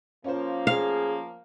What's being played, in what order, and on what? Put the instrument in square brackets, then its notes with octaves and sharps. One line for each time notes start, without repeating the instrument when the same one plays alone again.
[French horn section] F3 A#3 [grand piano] C#4 F4 C5
[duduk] G#4 [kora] F5